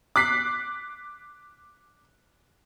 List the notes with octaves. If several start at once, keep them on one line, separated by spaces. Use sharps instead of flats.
D6 F#6 B6 C7